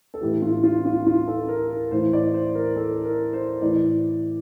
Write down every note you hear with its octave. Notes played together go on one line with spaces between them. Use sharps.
A4
A2 E3 G4
F4
F4
F4
F4
A4
A#4
A#4
A2 E3 C5
D5
C5
A#4
A4
A#4
C5
A2 E3 D5